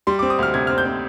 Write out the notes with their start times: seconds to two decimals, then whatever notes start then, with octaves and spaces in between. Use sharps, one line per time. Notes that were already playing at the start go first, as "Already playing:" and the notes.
0.07 G3 C6
0.19 D6
0.23 C4
0.30 D#6
0.39 D2 F6
0.54 C3 G#6
0.67 C4 F6
0.78 G6
0.85 C4